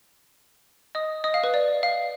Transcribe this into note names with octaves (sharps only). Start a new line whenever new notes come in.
D#5 D#6
D#5 D#6
F5
B4
D5
F5